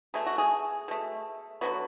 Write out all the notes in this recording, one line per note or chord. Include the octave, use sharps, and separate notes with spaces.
B2 A3 G#4
F#4
G#4
B2 A3
D3 F#3 B3 F#4